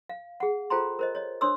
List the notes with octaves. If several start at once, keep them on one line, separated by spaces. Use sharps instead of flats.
F5
G#4 F#5
F4 A4 C5 G5 A#5 C6
A#4 C5 D#5
C#5 D#5
D4 C5 C#5 C6 D#6 E6